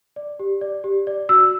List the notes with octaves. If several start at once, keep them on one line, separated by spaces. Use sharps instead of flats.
D5
G4
D5
G4
D5
F#4 E6